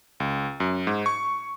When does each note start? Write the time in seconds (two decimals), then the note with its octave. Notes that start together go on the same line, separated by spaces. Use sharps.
0.20 C#2
0.60 F#2
0.87 G#2
1.06 C#6